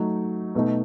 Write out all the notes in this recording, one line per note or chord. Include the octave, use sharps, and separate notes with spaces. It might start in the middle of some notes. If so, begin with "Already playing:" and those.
Already playing: F#3 A3 D#4
B2 A3 D#4